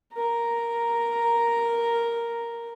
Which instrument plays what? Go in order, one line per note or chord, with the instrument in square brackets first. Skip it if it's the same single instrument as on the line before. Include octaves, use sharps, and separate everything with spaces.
[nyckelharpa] A#4 A#5